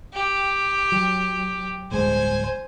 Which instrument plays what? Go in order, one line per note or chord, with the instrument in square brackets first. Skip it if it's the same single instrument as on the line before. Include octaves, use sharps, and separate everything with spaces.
[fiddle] G4
[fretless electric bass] F#3
[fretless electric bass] D1 G1 G#3 [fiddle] C5 G#5